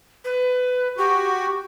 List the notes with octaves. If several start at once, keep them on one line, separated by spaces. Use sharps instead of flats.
B4
F#4 G4